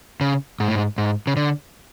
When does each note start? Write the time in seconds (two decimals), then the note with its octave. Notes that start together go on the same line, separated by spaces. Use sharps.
0.21 C#3
0.60 G#2
0.68 A2
0.76 G#2
0.98 G#2
1.27 C#3
1.37 D3